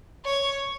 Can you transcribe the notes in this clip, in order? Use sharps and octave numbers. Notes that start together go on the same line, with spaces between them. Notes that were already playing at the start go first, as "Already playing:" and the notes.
C#5